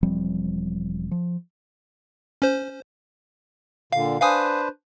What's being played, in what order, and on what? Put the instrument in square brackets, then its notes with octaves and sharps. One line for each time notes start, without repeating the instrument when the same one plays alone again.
[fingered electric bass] E1 F3 G3 C4
F3
[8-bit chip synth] C#4 C5
[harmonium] A#2 D3 [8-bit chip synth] F5
[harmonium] D4 B4 C5 [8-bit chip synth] F5 G#5 D#6